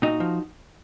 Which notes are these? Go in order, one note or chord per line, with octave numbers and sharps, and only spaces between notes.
A#2 D#4 F#4
F3